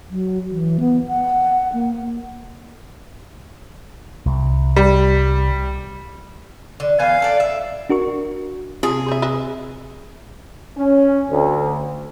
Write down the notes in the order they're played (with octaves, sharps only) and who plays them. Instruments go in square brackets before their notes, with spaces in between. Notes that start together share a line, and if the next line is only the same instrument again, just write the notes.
[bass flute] F#3
E3
B3
F#5
A#3
[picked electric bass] C2
[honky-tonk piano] G3
[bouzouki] D3
[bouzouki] E3 B3 G#5 [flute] F5
[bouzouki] A4 D5
E5
[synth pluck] D4 F#4 A#4 C#6
[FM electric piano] C3 [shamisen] F4 [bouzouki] G#4
[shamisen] C5 E5
B4 D#5 E5
[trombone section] C#4
D2